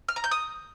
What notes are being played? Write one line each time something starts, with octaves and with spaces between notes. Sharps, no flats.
F6
A#5
G6
D#6